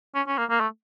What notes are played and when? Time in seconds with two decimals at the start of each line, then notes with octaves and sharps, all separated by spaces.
0.15 C#4
0.28 C#4
0.38 A#3
0.50 A#3
0.60 A3